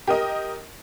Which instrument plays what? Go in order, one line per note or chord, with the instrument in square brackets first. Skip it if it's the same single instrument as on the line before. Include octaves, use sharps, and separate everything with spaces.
[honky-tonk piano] G4 A#4 D#5